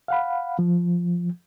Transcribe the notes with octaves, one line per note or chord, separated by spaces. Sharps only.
F5 F#5 B5
F3